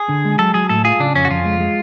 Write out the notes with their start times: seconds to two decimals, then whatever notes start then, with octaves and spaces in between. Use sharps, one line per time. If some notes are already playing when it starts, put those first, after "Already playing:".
Already playing: G#4
0.09 D3
0.25 G#3
0.39 F#3 A4
0.54 F#3 G#4
0.69 A2 A4
0.84 F4 G#4
1.00 C#3 D4
1.14 F2 C#4
1.25 F#4
1.30 F2 F4
1.45 G#3
1.60 G#3